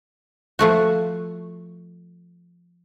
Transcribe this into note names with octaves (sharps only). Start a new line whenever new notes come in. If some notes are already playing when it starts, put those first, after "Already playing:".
F3 A3 F#4